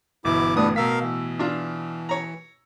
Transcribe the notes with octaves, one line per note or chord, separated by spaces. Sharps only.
G1 B2 E3 E4 D6
A2 G3 D4 B4 D#6
B2 A#4 F5 E6 B6
E3
D4 F4
C#5 A#5